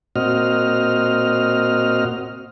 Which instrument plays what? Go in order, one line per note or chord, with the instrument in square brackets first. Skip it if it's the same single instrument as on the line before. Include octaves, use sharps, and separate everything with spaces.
[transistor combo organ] A#2 C4 F#4 D#5 F6